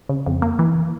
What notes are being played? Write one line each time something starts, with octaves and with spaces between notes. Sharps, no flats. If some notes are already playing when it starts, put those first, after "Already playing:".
C#3
F2
A#3
E3